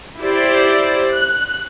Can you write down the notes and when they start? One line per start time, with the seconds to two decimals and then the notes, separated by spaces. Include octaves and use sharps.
0.22 E4 G4 C5 D5
1.15 F#6